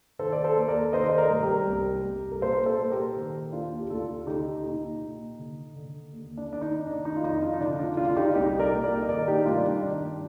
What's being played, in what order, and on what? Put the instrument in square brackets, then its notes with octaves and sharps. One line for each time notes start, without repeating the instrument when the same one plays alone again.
[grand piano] D#3 A4 C5
D5
A4 C5
D#2
A#4 D5
D#3 C5 D#5
C5
A#4 D5
G2
G4 A#4
C2
C2
A#4
A#2 A4 C5
A4 C5
A#2
G4 A#4
D#3
D#2 D4 F4
G4
D2 F4 A4
A4
D3 D#4 G4
A#2 D#4
A#2
D3
D3
D#2
D4
D#3 D4
D#4
D#3 D4
D#4
F4
F2 D#4
D4 F4
D#4
D3 D4
D4 F4
D3 D4 F4
F4
D#4 G4
C2 D#4 G4
A#4 D5
A#2
A#4 D5
D#5
D#3 A#4 D5
D#4 G4
G2 D4 F4
D4
D#4
D#3 D4